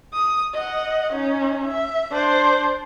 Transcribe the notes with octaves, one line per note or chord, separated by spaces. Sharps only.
D#6
D#5 F#5
C#4 D#4
E5
D4 C5